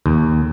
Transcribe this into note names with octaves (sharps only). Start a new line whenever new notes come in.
D#2